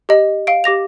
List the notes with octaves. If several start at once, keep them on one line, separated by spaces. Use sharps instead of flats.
G4 D#5
F5 D7
G4 D6 A#6 F7